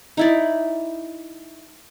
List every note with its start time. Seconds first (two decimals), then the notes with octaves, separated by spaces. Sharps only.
0.17 D#4 E4 D5